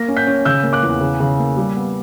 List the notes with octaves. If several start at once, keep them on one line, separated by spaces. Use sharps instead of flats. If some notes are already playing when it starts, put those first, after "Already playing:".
Already playing: A#3 A#6
C#4
G6 B6
C#4
C#3 E6 G6
A#3
D6 F#6
E2
C#3
C#3
A#3
G3
B3